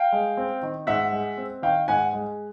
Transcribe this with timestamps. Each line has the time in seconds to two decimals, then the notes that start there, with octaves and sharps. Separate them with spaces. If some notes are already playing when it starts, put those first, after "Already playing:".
Already playing: F5 G5
0.12 G#3
0.37 C4
0.62 D#3
0.87 G#2 E5 F#5
1.12 G#3
1.37 C4
1.62 D#3 F5 G5
1.88 G#2 F#5 G#5
2.13 G#3